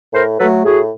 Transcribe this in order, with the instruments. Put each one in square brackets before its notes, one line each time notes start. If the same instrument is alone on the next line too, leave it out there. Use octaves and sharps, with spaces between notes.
[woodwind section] A2 A#4 C5
F#3 A3 A4 B4
A2 F#4 G#4